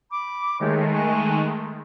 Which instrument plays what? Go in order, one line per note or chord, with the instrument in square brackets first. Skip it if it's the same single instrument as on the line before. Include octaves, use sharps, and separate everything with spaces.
[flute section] B5 D6
[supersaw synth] D#3 G#3 A3 [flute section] G4 C#5
[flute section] G#5 C#6 F#6